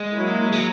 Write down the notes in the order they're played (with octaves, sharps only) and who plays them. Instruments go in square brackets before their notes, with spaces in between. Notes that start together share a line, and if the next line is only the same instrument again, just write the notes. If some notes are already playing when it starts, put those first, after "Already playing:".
Already playing: [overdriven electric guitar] G#3
[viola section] F#3 A#3 E4
[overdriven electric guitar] G#3
F#3